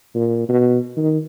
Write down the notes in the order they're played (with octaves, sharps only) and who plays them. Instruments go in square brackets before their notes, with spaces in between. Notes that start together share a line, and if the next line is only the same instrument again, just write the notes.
[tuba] A#2
B2
D#3